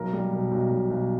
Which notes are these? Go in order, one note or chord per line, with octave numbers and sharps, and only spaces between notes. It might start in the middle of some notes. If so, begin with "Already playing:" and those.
Already playing: B1 A#4
G3
B2
B1
B1
B1